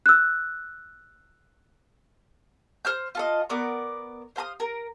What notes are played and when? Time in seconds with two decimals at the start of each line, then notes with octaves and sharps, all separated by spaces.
0.06 E6 F#6
2.85 C5 F6 G6
3.15 F4 A4 D#5
3.49 B3 A#4 D5 C#6
4.36 C5 F5 A#5 D#6
4.60 A#4